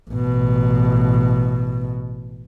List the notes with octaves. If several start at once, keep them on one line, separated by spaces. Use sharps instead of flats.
A1 B2